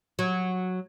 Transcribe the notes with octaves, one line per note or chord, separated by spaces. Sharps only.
F#3